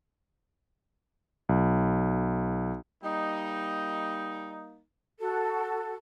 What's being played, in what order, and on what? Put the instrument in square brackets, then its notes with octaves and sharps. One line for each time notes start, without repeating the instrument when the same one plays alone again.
[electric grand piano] B1
[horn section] G3 A#3 D#4
[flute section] F#4 A4